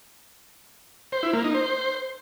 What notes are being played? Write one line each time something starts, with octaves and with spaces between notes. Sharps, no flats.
C5
E4
A#3
D#4
C5